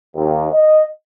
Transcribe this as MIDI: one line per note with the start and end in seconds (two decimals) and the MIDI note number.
0.15 0.49 39
0.52 0.84 75